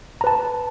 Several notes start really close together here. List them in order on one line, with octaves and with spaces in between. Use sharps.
A#5 B4 A5